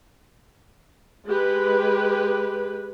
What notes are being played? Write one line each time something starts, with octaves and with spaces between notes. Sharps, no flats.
G#3 G4 B4